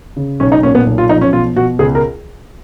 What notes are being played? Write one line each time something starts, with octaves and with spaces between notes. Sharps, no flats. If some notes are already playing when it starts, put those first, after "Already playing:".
C#3
B1 C#4
D#4
A#2 C#4
B3
B1
F4
F3 D#4
C#4
B2 F4
B2 F#4
C#2 G#4
A#4